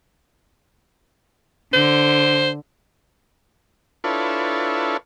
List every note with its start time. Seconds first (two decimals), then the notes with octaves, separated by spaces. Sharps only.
1.74 D3 C5
4.04 D4 E4 F4 A4 B4 C#5